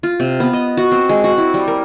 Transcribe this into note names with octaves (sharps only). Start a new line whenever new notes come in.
F4
C3
B3
D#5
F#4
C4
G#3
F#4
E4
G3
A#4